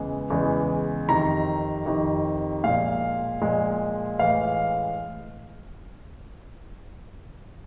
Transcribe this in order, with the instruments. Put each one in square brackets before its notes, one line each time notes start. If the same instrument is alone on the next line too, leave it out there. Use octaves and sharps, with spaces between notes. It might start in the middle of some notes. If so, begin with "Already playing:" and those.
Already playing: [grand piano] E2 C#3 E3 G#3
E2 C#3 E3 G#3
F2 C3 D#3 A#5
F2 C3 D#3
A#2 F3 G#3 F5
A#2 F3 G#3
A2 E3 G#3 F5